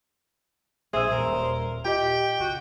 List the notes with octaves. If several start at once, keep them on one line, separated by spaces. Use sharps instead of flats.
A#1 G#4 C5 E5 E6
D#1 A#4
D#1 F4 G4 D#5 G5
C#3 F#4